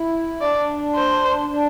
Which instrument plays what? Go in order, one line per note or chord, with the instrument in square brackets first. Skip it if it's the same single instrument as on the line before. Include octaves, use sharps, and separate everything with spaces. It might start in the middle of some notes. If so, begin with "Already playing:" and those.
Already playing: [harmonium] E4
[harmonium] D4 [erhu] D5
[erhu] C5
[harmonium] D4